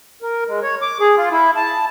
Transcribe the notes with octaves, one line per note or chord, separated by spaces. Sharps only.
A#4
G#3
C#5
D6
G#4
F4
E4
A5